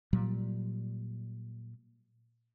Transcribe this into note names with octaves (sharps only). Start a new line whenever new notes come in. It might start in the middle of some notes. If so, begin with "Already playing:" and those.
A#2 F#3 G3